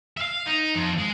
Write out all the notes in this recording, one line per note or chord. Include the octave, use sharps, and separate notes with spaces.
E5 F5
D#4
F2
G#3